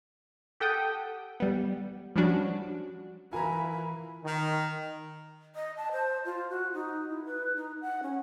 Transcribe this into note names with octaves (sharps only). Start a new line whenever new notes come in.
G4 A4 F#5 G5 D#6
G3 B3
F3 G3 C#4 D4 F#4
E3 F4 A#4 G#5 A#5 B5
D#3
D#5
A5
C5
F4
F#4
D#4
E4
B4
D#4
F#5
C#4